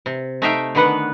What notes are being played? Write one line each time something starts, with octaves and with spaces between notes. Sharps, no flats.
C3
A3 D#4 E5 F5 G5
D3 D#3 B3 B4 F#5